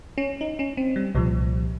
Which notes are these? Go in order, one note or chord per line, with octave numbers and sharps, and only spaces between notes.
C#4
D#4
C#4
C4
G3
C2 A#2 F3 G3